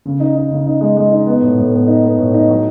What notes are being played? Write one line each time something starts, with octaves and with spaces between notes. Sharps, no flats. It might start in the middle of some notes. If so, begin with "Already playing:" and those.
C#3
D#4
D#4
C#3
D#4
G#3
G#3
D#4
B3
A2
A2
B3
D#4
B3
A2
D#4
F#3